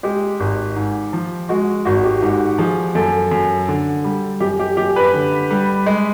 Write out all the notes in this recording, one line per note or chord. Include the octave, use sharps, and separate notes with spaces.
G#3 G4
G#1
G#2
F3
G#3 F#4
G#1 F#4
G4
G#2 G4
F3 G#4
F#2 A4
F#2
D3
G3
F#2 G4
G4
F#2 G4
B4
D3
G3
G#3